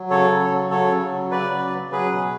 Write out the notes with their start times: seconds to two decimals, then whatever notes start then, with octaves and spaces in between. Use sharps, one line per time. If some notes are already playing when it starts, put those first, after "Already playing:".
Already playing: F#3
0.10 C#3 A4 C#5
0.31 F#3
0.51 C#3
0.70 F#3 A4 C#5
0.91 C#3
1.11 F#3
1.31 C#3 B4 D5
1.51 F#3
1.72 C#3
1.92 F#3 G#4 B4
2.12 B2